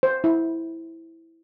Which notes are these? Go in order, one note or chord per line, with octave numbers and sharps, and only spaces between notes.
C5
E4